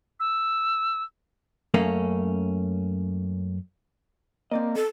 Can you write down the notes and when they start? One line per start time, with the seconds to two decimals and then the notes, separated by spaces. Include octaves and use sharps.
0.20 E6
1.74 F#2 A3 A#3 C#4
4.51 A#3 C4 D5 D#5
4.76 A4